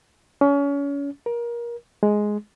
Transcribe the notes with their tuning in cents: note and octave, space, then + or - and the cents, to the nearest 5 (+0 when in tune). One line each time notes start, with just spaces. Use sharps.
C#4 +30
A#4 +25
G#3 +5